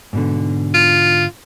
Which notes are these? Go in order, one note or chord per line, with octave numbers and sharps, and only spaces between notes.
G#2 B2 D3
F4